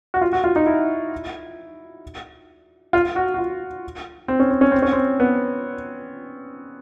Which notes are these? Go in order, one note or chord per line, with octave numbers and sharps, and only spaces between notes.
F#4
F4
F#4
F4
D#4
E4
F4
F#4
F#4
F4
C4
C#4
C4
C#4
C4
C#4
C4
B3